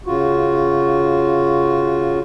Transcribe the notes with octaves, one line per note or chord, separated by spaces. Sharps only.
C#3 F4 F#4